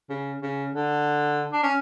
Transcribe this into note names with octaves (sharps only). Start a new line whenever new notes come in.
C#3
C#3
D3
D4
C#4